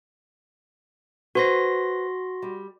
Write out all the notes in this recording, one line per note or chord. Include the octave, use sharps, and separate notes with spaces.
F#4 B4 C5 C6 A#6
G3